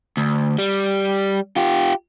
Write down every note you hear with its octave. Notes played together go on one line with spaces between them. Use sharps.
D2
G3
F4 G4